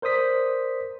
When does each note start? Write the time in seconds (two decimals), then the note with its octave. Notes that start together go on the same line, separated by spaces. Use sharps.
0.02 A#4 C5 D5 D#6 B6